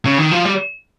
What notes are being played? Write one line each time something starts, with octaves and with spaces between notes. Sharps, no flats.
C#3
D#3
F3
G3